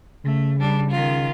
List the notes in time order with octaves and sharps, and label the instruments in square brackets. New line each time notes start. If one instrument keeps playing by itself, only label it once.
[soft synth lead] C#3 [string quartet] A3
[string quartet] G3 D4
D#3 F4